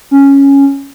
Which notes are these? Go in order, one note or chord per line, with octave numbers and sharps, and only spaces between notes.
C#4